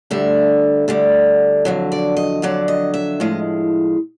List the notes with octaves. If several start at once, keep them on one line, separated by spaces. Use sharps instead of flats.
D2 D3 G3 E5
D2 D3 G3
F2 D3 F#3
D5
D#5
F2 D3 F#3 D5
D#5
E5
A2 F3 G#3 D#5